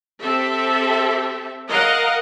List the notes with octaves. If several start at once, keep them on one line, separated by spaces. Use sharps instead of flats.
C4 G4 A4 E5
A#4 D#5 F5 F#5